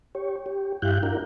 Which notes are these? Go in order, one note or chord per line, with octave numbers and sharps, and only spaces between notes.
G4 C#5
G4
G2 E4 G4 F5 F#6 G6
D4 E4 F#4 A#4